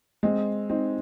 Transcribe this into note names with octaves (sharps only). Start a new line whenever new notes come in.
G#3 C4
C4 D#4